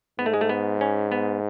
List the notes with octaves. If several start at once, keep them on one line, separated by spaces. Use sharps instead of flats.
G#2 B3
A3
G#3
A3
B3
C#4
B3